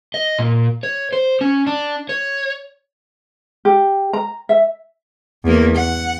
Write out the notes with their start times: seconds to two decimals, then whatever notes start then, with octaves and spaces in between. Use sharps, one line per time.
0.14 D#5
0.39 A#2
0.83 C#5
1.13 C5
1.41 C#4
1.67 D4
2.09 C#5
3.65 G4
4.13 A#5
4.49 E5
5.44 E2 A#3
5.76 F#5